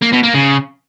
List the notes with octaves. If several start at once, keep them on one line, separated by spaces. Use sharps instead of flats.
A#3
B2
A#3
C#3